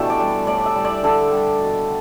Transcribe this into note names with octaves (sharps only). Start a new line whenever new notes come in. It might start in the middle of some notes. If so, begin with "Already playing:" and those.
Already playing: B2 E3 A3 D4 E4 G4 A4
D5
G3
A2 D5
E5
G3
D5
D3 A4
G3
B2